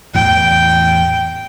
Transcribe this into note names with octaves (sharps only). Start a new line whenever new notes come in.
E2 A2 E3 G5